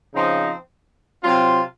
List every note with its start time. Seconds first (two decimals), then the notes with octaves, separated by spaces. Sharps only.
0.14 C#3 F3 C4 D#4
1.23 C3 F#3 C4 F4